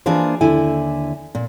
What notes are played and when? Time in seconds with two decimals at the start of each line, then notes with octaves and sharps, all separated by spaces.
0.06 E3 A#3 D4 F4 G#4 C5
0.41 D#2 D3 E4 G#5
1.35 A#2